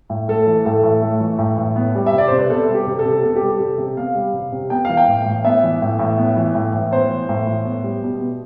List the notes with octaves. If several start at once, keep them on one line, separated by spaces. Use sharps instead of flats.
A2
A3 A4
E3
A2 A4
A2
A3
E3
A2
A2
B3
G3
E5
C3
D5
C3 C5
B4
B3 A4
G3
G4
C3
A4
C3
B3 A4
G4
G3
A4
C3
C3
B3 F5
G3
C3
C3
B3 G5
E3 F5
G5
A2
A2
B3 E5
E3
A2
A2
B3
E3
A2
A2
B3 C5
E3
A2
A2
B3
G3
B2
B2